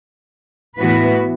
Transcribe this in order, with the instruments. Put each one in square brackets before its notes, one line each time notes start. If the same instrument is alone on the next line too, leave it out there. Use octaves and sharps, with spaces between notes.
[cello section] A2 E3 B3 F#4 B4